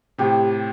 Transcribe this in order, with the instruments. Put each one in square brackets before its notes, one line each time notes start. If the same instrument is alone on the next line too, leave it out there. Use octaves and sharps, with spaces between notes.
[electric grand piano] A2 C3 [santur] G4